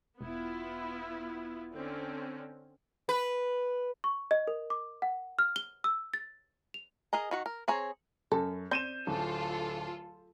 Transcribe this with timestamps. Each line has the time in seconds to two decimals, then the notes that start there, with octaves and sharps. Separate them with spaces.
0.21 E1 B3 E4 F4
1.73 D3 C4 C#4
3.09 B4
4.04 C#6
4.31 D#5
4.48 A#4
4.70 D6
5.02 F#5
5.39 F6
5.56 G7
5.84 E6
6.14 A6
6.74 F7
7.13 G#4 A#4 D#5 A#5
7.31 D#3 F#4 F#5
7.46 A#4
7.68 C4 G#4 C#5 A#5
8.32 F#2 A4
8.71 C4 D5 G6 D#7 E7
9.07 D1 F4 A4